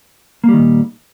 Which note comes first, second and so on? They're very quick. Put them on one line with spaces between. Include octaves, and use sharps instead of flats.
A#3 G3 D#3 A#2